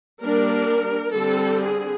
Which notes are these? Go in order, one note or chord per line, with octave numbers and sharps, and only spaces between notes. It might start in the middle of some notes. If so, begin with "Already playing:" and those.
G3 A#3 D4 A#4
D3 G3 C4 A4
G#4